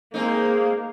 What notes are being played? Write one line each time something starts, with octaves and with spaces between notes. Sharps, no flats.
G#3 A#3 C4 D#4